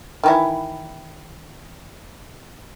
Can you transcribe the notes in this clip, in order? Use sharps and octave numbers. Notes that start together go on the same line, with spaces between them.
D#3 E3 E4